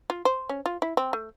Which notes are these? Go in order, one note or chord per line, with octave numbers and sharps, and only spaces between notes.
F4
C5
C#4
F4
E4
C4
A3